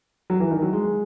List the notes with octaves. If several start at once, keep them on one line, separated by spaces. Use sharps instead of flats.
F#3
E3
D#3
F#3
G#3